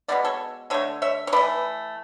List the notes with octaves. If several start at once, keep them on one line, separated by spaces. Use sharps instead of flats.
B2 G#3 B3 D5
A4 C#5
D3 A3 A4 C#5
C#5 E5
C#5
E3 A3 B4 D5